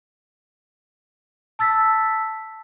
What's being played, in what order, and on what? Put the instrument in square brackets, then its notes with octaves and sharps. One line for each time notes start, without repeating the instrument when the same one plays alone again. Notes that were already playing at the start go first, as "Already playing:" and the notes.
[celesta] A5 E6 A6 B6